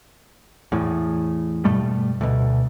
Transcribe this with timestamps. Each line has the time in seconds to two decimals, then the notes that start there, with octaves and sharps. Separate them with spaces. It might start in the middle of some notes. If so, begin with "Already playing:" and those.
0.72 E2 A2
1.65 G2 B2 G3 A3
2.21 D2 B2